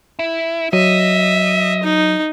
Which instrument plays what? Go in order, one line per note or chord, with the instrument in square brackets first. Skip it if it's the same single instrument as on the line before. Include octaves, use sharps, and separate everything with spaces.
[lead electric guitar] E4
[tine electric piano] F#3 [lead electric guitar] D#5 [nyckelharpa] E5
[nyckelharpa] D#4